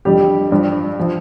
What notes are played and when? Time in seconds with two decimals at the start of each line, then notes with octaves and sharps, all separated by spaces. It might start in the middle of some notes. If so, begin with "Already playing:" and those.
0.05 F2 D3 G3 G4
0.51 G2 F3
1.00 F3